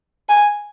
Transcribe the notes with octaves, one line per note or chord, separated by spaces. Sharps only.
G#5